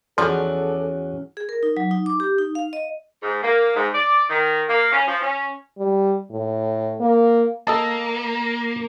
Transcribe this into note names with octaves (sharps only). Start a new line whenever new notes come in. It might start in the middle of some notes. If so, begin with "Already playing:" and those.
E2 F3 C#4 F#4 A4 D5
G#4
A#4
D#4
F#3
D#4
D6
G4
D#4
F5
D#5
G#2
A#3
G#2
D5
D#3
A#3
C#4
F3
C#4
G3
A2
A#3
A#3 A4 D#5 A5